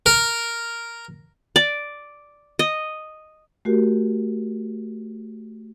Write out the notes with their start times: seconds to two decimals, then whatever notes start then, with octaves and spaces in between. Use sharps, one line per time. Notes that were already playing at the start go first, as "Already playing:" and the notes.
0.06 A#4
1.56 D5
2.59 D#5
3.65 A3 F#4 G4 A#4